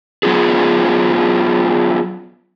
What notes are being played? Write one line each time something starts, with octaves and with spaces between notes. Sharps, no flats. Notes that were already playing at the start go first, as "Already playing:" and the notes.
F#3 B3 F4 G#4